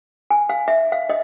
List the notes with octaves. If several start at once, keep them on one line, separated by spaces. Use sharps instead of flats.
G#5
F5
E5
F5
D#5